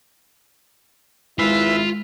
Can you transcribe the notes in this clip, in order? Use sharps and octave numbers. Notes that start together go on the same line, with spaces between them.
G#1 G#3 E4 F4 B4 E5